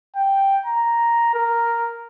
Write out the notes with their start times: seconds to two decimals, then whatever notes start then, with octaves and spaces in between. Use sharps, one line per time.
0.16 G5
0.66 A#5
1.34 A#4